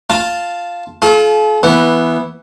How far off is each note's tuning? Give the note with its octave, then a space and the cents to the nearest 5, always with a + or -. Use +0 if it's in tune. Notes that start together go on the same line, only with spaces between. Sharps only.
F4 +0 F5 +0 A5 +0
F4 -5 A4 -45
E3 +0 B3 -10